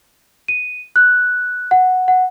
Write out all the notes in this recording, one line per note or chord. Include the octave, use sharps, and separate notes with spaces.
D#7
F#6
F#5
F#5